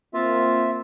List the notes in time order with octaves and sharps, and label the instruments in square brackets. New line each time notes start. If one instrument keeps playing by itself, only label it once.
[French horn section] A#3 C4 [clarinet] F4 [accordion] E5